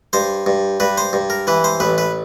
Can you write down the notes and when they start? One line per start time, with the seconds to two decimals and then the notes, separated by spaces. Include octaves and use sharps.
0.13 G2 C5
0.46 G2
0.80 G2 B4
0.98 C5
1.13 G2
1.30 A#4
1.47 E3 B4
1.64 C5
1.80 A1 B4
1.98 B4